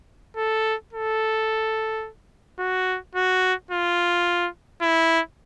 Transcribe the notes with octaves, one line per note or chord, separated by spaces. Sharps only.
A4
A4
F#4
F#4
F4
E4